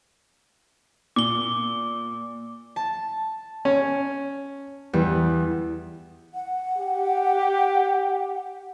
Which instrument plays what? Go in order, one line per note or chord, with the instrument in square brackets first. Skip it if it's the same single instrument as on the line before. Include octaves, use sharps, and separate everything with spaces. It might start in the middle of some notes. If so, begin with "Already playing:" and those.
[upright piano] A#2 [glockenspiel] D6 G7
[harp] A5
[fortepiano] C#4
[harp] E2 [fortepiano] G3 B3
[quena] F#5
[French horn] G4